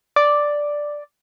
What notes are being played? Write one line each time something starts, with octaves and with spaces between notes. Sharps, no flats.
D5